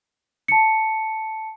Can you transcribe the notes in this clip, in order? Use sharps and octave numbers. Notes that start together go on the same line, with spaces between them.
A5 C#7